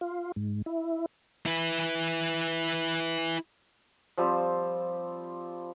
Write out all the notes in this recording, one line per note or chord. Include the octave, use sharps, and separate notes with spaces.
F4
G#2
E4
E4 B4
F3 G3 C4